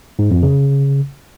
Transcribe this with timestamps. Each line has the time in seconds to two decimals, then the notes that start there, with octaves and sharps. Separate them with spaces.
0.19 G#2
0.31 F2
0.43 C#3